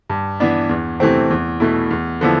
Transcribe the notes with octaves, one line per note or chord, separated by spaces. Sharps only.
G2
E3 B3 D4
E2
C3 E3 A3 C4
E2
B2 A3 E4
E2
D3 F3 B3 E4